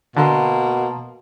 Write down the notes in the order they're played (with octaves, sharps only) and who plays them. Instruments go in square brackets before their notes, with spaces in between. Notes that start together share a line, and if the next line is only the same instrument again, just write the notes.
[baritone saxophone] B2 [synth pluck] D3 [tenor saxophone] A#3 [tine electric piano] A5 A#5 C6